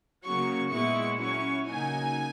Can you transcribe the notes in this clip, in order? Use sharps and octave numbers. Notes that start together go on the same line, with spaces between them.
C#3 F#3 A#3 C#6
A#2 G#3 B3 E4 C#6
F#3 C#4 E4 C#6
C#3 F#3 A#3 D#4 G#5